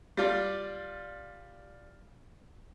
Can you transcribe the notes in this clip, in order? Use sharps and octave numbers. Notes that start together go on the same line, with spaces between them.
G3 F4 D5